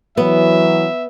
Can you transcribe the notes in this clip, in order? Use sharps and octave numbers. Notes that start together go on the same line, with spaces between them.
E3 F#3 B3 E5